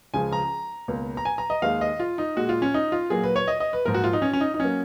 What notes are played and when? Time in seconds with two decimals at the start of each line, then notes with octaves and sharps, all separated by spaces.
0.14 C#2 C#3 F3 G#3 G#5
0.33 A#5
0.88 C#2 B2 A#3
1.17 A#5
1.25 G#5
1.38 A#5
1.50 D#5
1.62 D#2 D#3 G#3 F5
1.81 D#5
2.00 F4
2.18 D#4
2.36 A#2 G#3 F#4
2.49 F4
2.62 C#4
2.74 D#4
2.92 F4
3.10 A#2 F#3 A#3 G#4
3.24 B4
3.36 C#5
3.48 D#5
3.60 D#5
3.73 B4
3.85 G#2 F3 A#3 A#4
3.94 F#4
4.04 F4
4.13 D#4
4.22 C#4
4.33 C#4
4.41 D#4
4.54 D#4
4.60 F#3 A#3 C#4